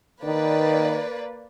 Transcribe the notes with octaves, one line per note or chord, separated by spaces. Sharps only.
D#3 A#3 B4 D5